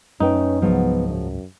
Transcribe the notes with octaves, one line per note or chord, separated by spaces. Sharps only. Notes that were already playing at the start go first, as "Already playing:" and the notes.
F#2 A3 C#4 D#4 B4 G5
C#2 G#2 F3 F#3 B3 G#4
F#2